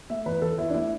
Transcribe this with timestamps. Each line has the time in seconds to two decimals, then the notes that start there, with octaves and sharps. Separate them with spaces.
0.10 A3 E5
0.26 E2 B4
0.42 E3 A4
0.58 E2 E4
0.70 D4
0.74 A3 E4